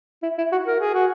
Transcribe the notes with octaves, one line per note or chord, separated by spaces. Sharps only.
E4
E4
F#4
A#4
G#4
F#4